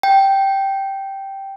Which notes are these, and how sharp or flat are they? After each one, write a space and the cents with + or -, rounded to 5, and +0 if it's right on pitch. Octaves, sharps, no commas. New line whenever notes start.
G5 -5